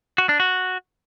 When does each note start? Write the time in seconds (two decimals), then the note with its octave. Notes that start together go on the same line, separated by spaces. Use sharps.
0.18 F#4
0.29 D4
0.40 F#4